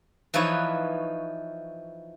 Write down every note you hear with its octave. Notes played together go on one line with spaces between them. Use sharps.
E3 F3 D#4 B4 C#5